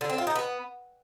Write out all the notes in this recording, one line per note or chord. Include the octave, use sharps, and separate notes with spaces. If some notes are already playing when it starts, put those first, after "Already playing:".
D3
C4
F4
D#4
B3